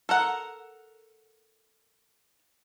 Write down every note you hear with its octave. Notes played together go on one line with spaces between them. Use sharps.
A4 A#4 F#5